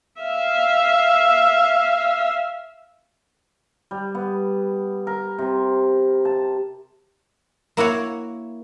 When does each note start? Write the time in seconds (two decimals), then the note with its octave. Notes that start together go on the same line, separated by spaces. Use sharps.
0.21 E5 F5
3.91 G3
4.15 B3
5.07 A#4
5.39 C3
6.25 A5
7.77 A#3 E4 F#4 C#5